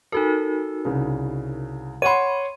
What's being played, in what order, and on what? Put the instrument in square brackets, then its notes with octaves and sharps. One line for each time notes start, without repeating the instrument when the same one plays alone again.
[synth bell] D#4 F#4 A#4 [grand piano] A4
[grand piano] C2 C#3
[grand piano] C#5 F#5 C6 [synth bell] B5 D#7